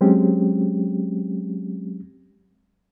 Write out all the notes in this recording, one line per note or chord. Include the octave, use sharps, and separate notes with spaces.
F#3 G#3 C4 C#4 G4